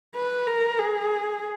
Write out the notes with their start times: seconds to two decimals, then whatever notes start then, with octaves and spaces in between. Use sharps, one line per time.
0.15 B4
0.47 A#4
0.80 G#4